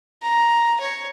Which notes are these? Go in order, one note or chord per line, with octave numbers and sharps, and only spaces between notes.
A#5
C#5